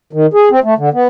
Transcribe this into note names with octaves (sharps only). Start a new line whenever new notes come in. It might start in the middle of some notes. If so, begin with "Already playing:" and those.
D#3
G#4
C4
A3
D3
B3